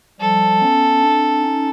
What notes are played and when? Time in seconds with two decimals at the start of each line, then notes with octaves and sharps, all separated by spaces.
0.20 F3 G3 A4
0.60 B3 C#4
1.01 C4 D4
1.41 C#4 D#4